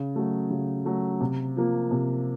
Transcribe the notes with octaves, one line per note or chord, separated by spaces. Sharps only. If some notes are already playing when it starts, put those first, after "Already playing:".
Already playing: C#3
F#3 A3
C#3
F#3 A3
C3
F3 A#3
C3